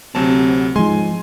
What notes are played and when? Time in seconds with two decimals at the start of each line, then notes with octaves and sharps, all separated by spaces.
0.15 D2 C3 F#3 C4 A5
0.76 G#2 F3 G#3 G#5 C6